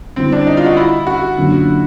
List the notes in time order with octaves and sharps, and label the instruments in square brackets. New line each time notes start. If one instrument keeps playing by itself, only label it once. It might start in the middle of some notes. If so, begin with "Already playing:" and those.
[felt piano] D3 G3 B3 E4 [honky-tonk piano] C4
[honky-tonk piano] D4
D#4
F4
F#4
E4
F#4
[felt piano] F#2 D3 F#3 A#3